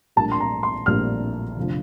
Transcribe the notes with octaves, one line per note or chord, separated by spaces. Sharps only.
A#1 A2 G3 A#3 D4 A5
C6
A#5
C6
A#1 A2 G3 A#3 D4 F6
F1 D3 F3